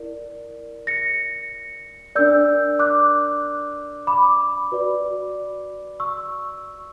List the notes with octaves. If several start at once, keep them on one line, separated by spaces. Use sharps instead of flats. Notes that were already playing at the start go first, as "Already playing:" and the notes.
Already playing: E4 A#4 D5
A#6 C#7
D4 A#4 D5 E6 G6
D6 F#6
B5 D6
F#4 B4 D5
C#6 E6